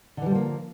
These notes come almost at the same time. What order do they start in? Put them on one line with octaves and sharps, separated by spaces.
D3 E3 G3 F3 A#3